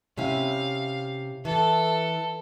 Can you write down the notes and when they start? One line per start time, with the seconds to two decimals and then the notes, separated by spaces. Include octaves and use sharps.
0.17 C3 C#4 E4 F5
1.45 E3 A4